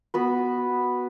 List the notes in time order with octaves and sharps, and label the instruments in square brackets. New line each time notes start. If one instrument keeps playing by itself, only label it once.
[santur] B3 F#4 B4